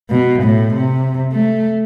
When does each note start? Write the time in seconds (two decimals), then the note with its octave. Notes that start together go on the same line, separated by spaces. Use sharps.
0.10 B2
0.43 A2
0.74 C3
1.32 A3